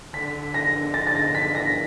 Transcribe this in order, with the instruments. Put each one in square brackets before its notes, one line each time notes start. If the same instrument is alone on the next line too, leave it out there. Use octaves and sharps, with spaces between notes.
[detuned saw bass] D3 [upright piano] B6
[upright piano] A#6
A6
A6
A#6
B6
A#6